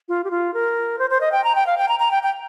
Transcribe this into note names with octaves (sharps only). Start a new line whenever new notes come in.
F4
G4
F4
A#4
C5
C5
D#5
G5
A#5
G5
F5
G5
A#5
A#5
G5
G5